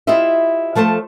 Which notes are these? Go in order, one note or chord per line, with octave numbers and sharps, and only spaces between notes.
E4 F4 G4 C5 D#5 E5
F3 A3 A4 C5 A5